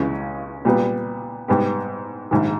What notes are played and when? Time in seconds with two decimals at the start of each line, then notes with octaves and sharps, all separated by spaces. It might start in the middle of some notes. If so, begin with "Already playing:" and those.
Already playing: C#2 C#3 E3 G#3 C#4
0.65 A#2 G3 B3
1.48 G#2 G3 B3 G4
2.31 A#1 G#2 D#3